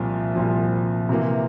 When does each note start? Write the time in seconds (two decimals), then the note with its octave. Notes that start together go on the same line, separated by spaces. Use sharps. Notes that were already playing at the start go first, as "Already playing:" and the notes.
Already playing: C2 A#2 F3
0.35 C2 A#2 F3
1.09 C3 E3 A#3